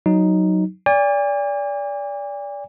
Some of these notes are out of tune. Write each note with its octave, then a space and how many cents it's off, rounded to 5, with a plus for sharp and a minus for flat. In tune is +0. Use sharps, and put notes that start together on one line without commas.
F#3 +0 D#4 +0
D5 -25 G#5 -45